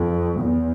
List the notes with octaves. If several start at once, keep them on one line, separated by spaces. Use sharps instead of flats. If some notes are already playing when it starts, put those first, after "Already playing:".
Already playing: F2
E2